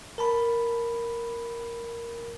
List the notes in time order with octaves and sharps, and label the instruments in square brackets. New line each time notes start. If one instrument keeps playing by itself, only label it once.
[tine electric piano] A#4 A5 B5